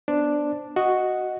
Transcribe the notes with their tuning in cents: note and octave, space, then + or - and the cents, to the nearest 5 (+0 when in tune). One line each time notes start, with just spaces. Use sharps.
B3 +0 D4 +0 C5 +0
F#4 +0 D#5 +0